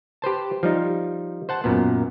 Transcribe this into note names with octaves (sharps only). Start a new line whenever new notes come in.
G4 B4 C5 A5
F3 G3 D#4
C5 F#5 A5
F#2 A#2 B3